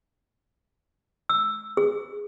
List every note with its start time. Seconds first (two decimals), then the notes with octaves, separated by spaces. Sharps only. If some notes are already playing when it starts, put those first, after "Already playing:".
1.29 E6
1.77 G#4